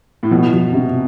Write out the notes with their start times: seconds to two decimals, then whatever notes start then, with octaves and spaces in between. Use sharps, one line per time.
0.23 A2
0.31 B2 F3
0.53 F3
0.73 C3